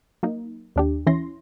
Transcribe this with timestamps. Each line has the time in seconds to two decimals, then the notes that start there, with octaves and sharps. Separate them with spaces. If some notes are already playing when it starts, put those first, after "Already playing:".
0.23 F#3 A#3 D#4
0.76 D#2 D4 G4
1.07 E3 C#4 E4 C6 A#6